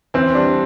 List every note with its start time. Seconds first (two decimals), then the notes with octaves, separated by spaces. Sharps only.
0.14 E3 C4
0.35 G3 D4